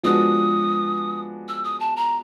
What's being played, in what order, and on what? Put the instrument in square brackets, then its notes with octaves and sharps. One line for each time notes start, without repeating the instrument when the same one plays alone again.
[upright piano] F3 G#3 B3 D4 F#4 [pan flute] D#6
[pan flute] E6
D#6
A5
A#5